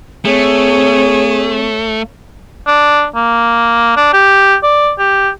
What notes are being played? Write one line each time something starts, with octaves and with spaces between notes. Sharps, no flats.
A3 C4 G#4 C#5
D4
A#3
D4
G4
D5
G4